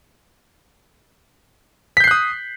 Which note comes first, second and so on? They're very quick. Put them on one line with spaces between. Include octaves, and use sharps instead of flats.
B6 G6 C7 F#6 D#6